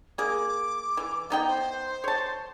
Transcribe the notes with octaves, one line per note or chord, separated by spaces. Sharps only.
A#3 G#4 D6
E3
B3 D#4 G5
C5
C#5 A5